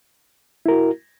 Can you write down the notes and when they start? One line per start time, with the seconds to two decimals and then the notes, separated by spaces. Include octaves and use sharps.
0.66 E4
0.68 A#4
0.71 F#4